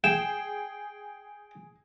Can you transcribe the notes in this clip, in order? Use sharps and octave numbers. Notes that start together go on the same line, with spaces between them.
G#4 G5 E7